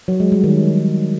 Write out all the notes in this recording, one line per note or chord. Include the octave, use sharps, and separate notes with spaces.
F#3
G#3
G3
D#3